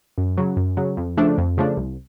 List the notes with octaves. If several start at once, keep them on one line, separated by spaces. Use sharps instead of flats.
F#2
C#3 F#3
F#2
C#3 F#3
F2
C#3 F3 A3 D4
F2
C#3 F3 A3 D4
C2